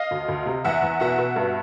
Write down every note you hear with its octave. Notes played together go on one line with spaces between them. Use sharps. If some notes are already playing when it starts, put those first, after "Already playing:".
Already playing: D#5 F5
D2
D2
C3
E2 E5 F#5
E2
B2 E5 F#5
B2
G2